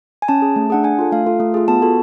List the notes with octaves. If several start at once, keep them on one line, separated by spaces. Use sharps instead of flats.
G#5
C#4 A5
G#4
A3
D4 G#4 F#5
D4 G#5
F4 A4
A3 F5
F4 A4
A3
F4 G#4
B3 A5
F#4 A4